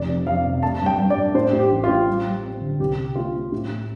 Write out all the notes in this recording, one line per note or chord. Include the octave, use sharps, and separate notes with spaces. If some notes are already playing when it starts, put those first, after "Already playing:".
Already playing: F1 D5
F2
F2 F5
C3
A3 A5
G2
G5
G2
D5
G2
A2 C5
A2
G4
A1
F4
A2
G3
G3
C4
D3
C2 G4
C3
A3 F4
C4
A2
A3